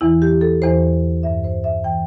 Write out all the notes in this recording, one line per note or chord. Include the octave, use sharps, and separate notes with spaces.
E2 E3 E4
G4
A4
E2 E3 C5
G2 E3 E5
C5
E5
E3 G5